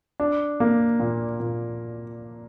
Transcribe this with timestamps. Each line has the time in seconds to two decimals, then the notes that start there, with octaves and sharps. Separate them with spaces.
0.20 D4
0.60 A#3
1.00 A#2
1.40 A#2